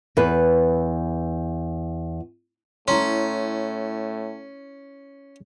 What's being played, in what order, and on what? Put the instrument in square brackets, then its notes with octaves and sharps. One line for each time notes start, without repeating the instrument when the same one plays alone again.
[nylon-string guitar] E2 B4
[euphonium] A2 [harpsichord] C#4 [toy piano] E4 A#5 C6